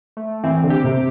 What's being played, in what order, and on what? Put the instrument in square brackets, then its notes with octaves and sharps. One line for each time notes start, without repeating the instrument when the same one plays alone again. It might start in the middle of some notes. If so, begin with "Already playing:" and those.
[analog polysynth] A3
[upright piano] E3 [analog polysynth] C4
[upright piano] D3
[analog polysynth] G4
[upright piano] C3